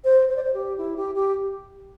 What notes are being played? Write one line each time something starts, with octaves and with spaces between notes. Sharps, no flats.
C5
C5
D5
C5
G4
E4
G4
G4